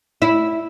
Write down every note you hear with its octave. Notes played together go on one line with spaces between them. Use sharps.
E4